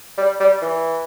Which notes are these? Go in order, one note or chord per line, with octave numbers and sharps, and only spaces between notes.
G3
G3
E3